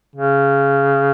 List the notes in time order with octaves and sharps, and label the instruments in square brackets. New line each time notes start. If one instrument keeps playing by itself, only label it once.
[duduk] C#3